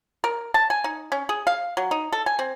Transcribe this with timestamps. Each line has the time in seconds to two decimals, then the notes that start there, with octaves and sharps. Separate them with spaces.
0.24 A#4
0.54 A5
0.70 G#5
0.84 D#4
1.12 C#4
1.29 G#4
1.47 F5
1.77 F#3
1.91 D#4
2.12 A4
2.26 G#5
2.39 C4